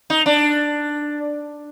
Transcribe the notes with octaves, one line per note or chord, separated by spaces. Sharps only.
D#4
D4